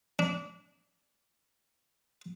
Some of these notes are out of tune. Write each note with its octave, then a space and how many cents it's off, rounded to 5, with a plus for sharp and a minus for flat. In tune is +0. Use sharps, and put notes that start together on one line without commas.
D4 -25